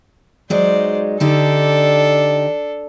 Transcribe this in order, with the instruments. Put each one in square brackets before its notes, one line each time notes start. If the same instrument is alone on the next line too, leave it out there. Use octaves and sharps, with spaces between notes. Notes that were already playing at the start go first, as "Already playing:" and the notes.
[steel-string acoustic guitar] F#3 G#3 D#4 [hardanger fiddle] C5 D5
[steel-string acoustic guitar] D3 D#4 G4 [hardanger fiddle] D4 A4